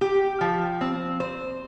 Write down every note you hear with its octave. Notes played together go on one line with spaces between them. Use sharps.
G4
F3
C4
C5